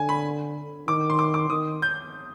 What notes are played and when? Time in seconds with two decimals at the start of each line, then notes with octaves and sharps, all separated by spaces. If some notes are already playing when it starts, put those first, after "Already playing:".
Already playing: D3 G#5
0.09 B5
0.88 D#3 D6
1.10 C6
1.19 D6
1.34 D6
1.50 D#3 D#6
1.82 G6